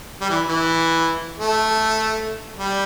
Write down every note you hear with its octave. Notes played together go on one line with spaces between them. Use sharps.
G3
E3
E3
A3
G3